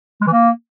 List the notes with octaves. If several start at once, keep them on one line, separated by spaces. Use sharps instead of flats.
G#3
E3
A#3